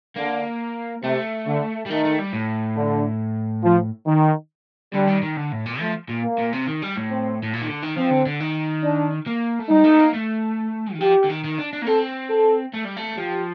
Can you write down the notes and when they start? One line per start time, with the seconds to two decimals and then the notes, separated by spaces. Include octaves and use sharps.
0.16 D3 A#3
1.03 C3 A3
1.47 D3
1.86 G3
1.90 D#3 A3
2.05 A3
2.19 G3
2.33 A2
2.77 D3
3.64 F3
4.07 D#3
4.94 D3 G3
5.08 D#3
5.22 D#3
5.37 D3
5.52 A2
5.66 A#2
5.80 F3 A3
6.09 A#2
6.24 A#3
6.38 A#2
6.52 C3
6.67 D#3
6.82 G3
6.96 A2
7.10 C4
7.43 A2
7.53 A#2
7.62 D#3
7.68 D3
7.83 D#3
7.97 F3 C4
8.11 D3
8.26 D3
8.40 D#3
8.84 D4
9.27 A#3
9.60 A3
9.70 G3 D#4
9.84 A3
9.99 A#3
10.14 A3
10.94 D#3
11.01 F3 G4
11.24 D3
11.30 D#3
11.44 D#3
11.58 D4
11.73 D4
11.82 A#3
11.87 C4 A4
12.30 A4
12.74 A3
12.85 G3
12.97 A3
13.17 F3 G4